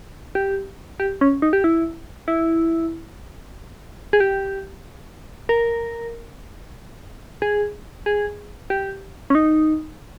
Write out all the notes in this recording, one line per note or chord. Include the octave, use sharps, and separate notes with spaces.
G4
G4
C#4
D#4
G4
E4
E4
G#4
G4
A#4
G#4
G#4
G4
C#4
D#4